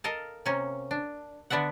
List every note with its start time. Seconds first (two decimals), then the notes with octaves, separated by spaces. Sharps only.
0.04 A4 A#4 D#5 F5 A5
0.46 C3 A#3 C#4
0.91 D4
1.50 D3 B3 D4 E5 F#5